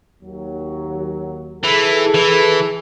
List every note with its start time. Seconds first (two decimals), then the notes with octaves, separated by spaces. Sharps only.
0.21 D#2 F#3
1.63 E3 G#4 A4
2.14 E3